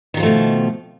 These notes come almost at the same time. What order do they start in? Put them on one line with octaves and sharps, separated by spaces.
D#3 F#3 F3 A3 B2